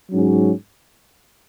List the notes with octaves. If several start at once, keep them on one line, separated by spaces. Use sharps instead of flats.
G#2 F#3 C#4